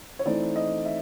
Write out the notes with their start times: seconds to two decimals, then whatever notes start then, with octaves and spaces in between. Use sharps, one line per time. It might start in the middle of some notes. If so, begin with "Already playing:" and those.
0.19 C#5
0.25 E3 A3 C4 D#4 D5
0.56 D#5
0.85 E5